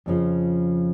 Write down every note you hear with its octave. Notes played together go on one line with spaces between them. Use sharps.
F2 C#3 F3